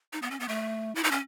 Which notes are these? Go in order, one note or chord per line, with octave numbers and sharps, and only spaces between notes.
D#4
B3
C#4
B3
A3
E4
D#4
C#4